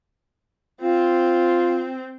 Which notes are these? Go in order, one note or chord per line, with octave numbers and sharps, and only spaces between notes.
C4 F4